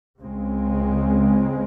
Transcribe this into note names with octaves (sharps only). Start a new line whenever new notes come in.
C#2 C#3 G#3 C4